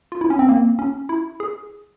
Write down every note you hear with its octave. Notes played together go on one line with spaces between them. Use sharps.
F4
E4
C#4
C4
A#3
C#4
E4
G#4